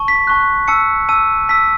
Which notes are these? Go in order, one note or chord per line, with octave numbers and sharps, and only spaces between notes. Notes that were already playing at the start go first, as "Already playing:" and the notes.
Already playing: A5 C#6
B6
A5 C#6 F#6
A5 E6 C#7
A5 E6 D#7
A5 E6 B6